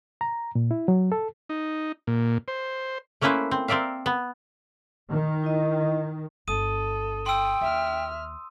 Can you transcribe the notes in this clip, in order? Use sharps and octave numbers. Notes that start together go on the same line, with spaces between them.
A#5
A#2
E4
F#3
A4
D#4
A#2
C5
A3 A#3 C#4 E4 B4 C5
C4
C4 A#4 D5 E5 F5
B3
D#3
E4 D#5
G1 D4 A4 D#6 D#7
G5 C6 E6
D#2 E5 F6